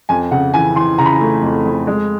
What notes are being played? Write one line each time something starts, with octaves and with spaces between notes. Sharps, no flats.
F2 G#5
C#3 F#5
E3 G#5
E3 C6
C#3 A#5
B5
A#5
A3
F2
F2
G#3